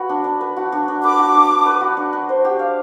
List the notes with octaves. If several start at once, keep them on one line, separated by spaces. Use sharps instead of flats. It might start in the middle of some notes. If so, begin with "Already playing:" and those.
Already playing: F#4 B4
D4
D4
B4
F#4
D4
D4
B4 D6
F#4
D4
D4
B4
F#4
D4
D4
C5
G4
F5